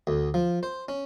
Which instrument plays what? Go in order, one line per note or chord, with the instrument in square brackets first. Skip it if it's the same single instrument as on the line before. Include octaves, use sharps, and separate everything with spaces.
[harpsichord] D2
F3
C5
C#4